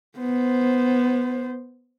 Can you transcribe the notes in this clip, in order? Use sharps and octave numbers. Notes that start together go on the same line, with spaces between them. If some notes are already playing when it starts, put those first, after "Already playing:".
B3 C5